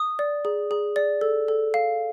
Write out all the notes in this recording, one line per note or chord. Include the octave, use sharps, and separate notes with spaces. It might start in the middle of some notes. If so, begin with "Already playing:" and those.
Already playing: D#6
D5
G#4
G#4
D5
A4
A4
F5